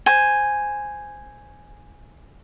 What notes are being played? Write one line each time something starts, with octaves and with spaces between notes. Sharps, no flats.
C5 G#5